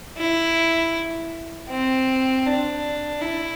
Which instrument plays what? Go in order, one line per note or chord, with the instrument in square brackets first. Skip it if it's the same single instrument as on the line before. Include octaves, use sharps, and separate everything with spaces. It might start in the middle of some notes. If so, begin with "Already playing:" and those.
[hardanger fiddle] E4
C4
D4
E4